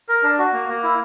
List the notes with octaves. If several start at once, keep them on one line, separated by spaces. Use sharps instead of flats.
A#4
D4
F#4
A#3
A#3
E4